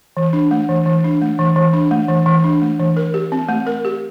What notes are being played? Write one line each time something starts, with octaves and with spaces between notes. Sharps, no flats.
E3
D4
A3
E3
E3
D4
A3
E3
E3
D4
A3
E3
E3
D4
A3
E3
A#4
G4
C4
A3
A#4
G4